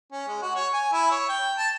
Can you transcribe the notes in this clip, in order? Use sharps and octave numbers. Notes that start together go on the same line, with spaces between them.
C#4
G#3
F#4
C#5
G#5
E4
C#5
G5
A5